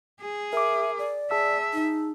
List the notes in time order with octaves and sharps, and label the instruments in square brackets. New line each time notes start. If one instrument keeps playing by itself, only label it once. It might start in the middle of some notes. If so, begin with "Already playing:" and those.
[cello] G#4
[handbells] A#4 D6 [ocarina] E5
[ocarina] D5
[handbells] G#4 A5 E6 [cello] E5
[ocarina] D#4